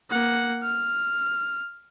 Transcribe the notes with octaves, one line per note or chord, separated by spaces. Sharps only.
A#3 F#5
F6